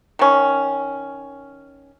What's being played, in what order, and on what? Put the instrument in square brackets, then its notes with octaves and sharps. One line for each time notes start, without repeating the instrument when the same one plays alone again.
[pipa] D#3 C#4